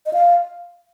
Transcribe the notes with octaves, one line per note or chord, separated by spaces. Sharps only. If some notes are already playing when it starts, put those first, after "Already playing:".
D#5
F5